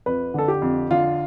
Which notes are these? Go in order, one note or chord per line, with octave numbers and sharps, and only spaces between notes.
F2 B4
D3 A4
G4
F2
D3 F4